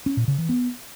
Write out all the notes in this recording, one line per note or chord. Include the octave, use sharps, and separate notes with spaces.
C#4
A#2
C#3
E3
B3